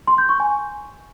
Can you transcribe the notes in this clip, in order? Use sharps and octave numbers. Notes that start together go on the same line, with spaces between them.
C6
G6
C#6
G#5